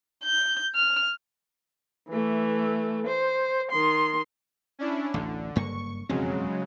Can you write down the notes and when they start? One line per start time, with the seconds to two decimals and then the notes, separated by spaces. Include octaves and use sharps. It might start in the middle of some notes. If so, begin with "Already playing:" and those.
0.25 G6
0.75 F6
2.09 E3 A3
3.07 C5
3.72 D#3 C6
4.79 C#4 D4 E4
5.14 A1 D2 D3
5.56 F#1 G2 A#3 C#6
6.09 E1 F2 C#3 F#3 G#3 C4